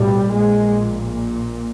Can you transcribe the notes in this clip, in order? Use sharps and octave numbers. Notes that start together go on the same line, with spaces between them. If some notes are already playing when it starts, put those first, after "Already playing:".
Already playing: B1 A2 G3
A#1 A#2 G#3